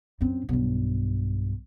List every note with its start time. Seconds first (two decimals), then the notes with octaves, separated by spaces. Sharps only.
0.21 F#2 C4
0.49 B1 G2